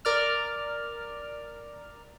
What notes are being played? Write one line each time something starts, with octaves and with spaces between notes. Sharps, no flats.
A#4 D5 F6